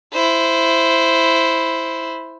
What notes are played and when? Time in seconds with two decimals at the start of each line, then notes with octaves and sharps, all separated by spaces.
0.13 E4 C5